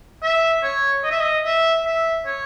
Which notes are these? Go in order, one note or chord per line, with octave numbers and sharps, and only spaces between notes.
E5
C#5
D#5
E5
D#5
E5
E5
C#5